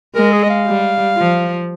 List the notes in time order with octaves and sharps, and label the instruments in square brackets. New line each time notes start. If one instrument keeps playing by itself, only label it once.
[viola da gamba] G#3 [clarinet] A#4
[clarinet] G#4
D#5
F5
[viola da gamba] G3
F3